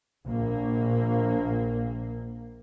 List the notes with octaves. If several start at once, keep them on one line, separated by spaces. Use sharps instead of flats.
A#1 A#3